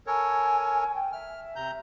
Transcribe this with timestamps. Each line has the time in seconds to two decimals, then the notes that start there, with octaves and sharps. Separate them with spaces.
0.07 A4 A#4 C#5 G#5
0.94 G5
1.12 E5 F6
1.56 C3 A#5 G6